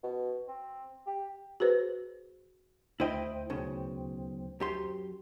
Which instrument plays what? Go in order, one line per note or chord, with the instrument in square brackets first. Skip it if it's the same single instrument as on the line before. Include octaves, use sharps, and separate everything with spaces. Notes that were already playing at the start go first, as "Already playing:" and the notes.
[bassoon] B2
C4
G4
[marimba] F#4 G#4 B4 C5
[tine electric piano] D2 C5 G5 [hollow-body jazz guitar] E4 D#5
[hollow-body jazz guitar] B1 C#3
F#2 G4 C6